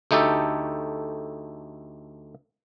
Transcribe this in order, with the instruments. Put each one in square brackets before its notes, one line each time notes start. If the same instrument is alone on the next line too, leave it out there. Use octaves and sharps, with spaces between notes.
[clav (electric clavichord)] D2 A3 D#4 G4 A4